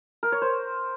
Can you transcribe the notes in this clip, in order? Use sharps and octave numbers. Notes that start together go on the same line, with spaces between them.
A#4
C#5
C5